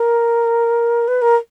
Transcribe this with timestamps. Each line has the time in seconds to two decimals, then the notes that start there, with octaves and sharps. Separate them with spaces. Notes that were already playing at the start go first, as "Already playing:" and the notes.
Already playing: A#4
1.08 B4
1.22 A#4